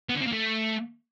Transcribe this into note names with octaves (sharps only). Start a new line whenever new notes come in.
B3
D3
C4
A#3
A3